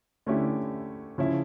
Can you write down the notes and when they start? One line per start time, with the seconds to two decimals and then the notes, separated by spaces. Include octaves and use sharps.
0.26 D3 A3 C#4 E4 G4
1.18 C#3 F3 C#4 E4